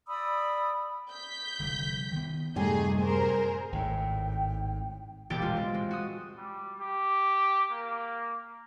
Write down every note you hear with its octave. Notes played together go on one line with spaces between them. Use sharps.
D5 B5 D#6 E6
G6 B6
F1 D3 G3
D#3 B3
F#2 A2 C3 G3 A3 D#4 G#4 G#5
G#4 A#4 C5
G#1 A2 G5
E1 A#1 G4 G5 A6 D7
G#3 F4
C4
G#3
F#4 D#6
G3
G4
A#3